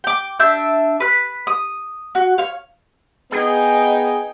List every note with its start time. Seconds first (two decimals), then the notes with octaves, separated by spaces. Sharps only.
0.04 G5 D6
0.40 D4 E5 G6
1.00 B4 F#6
1.47 D#6
2.15 F#4
2.38 C#5 F5
3.32 B3 D#4 G#4 G5